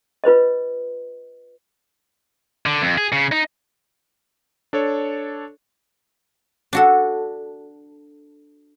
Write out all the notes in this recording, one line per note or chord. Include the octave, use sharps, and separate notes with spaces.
F4 B4 C5 D#5
D3
F2
G#4
C#3
D#4
D4 A4 C#5
D4 F#4 A4